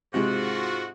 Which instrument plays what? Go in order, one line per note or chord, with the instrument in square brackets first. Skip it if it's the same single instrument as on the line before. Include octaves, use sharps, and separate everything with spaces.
[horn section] G#2 F4 F#4 [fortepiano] C3 G#3